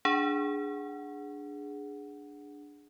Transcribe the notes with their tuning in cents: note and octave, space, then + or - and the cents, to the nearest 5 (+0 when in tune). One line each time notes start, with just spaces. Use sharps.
D4 +0 G#4 +0 F#5 +0